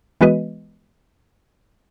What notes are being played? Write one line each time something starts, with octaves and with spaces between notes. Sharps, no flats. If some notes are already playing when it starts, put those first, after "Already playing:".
E3 G#3 B3 F#4 B4 D#5